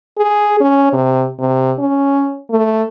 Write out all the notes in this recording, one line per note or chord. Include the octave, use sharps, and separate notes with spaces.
G#4
C#4
C3
C3
C#4
A3